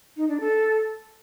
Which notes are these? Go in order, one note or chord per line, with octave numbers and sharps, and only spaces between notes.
D#4
D4
A4